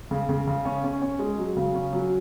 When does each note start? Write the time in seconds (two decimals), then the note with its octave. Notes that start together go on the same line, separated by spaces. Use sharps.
0.11 C#3
0.29 C#3
0.47 C#3
0.65 C#4
0.84 C#4
1.02 C#4
1.19 G#3
1.38 F#3
1.57 C#3
1.74 C#4
1.93 F#3